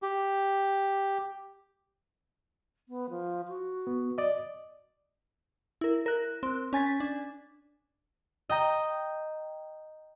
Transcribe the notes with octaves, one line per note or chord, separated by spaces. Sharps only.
G4
B3
F3
F#4
B3
D5 D#5
E4 A#4
A#4 F#6
C4
C#4 G#5 A6 B6
D4
D#5 G5 A#5